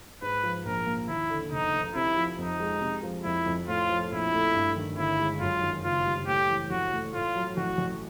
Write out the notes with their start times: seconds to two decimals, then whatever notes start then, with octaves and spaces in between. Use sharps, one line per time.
0.22 G#2 B4
0.43 F3
0.65 A#1 A#4
0.87 A#3
1.08 D#2 E4
1.30 D3
1.52 F1 D#4
1.73 F1
1.95 C3 E4
2.16 F3
2.38 F2 D#4
2.60 G#3
2.82 C3
3.03 F3
3.24 F2 E4
3.46 F2
3.68 A2 F4
3.89 F3
4.11 A#1 E4
4.33 A3
4.54 G2
4.76 D#3
4.98 G1 E4
5.19 G#3
5.40 F#2 F4
5.62 D#3
5.84 F#1 F4
6.05 G3
6.27 A2 G4
6.49 E3
6.71 A1 F#4
6.92 A3
7.14 A2 F4
7.35 F#3
7.57 A1 F#4
7.78 A1